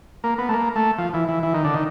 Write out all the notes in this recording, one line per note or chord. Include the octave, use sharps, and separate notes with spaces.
A#3
B3
A3
A#3
A3
F3
E3
E3
E3
D#3
D3
D#3